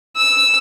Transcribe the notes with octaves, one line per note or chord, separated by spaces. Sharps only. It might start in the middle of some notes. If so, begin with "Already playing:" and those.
E6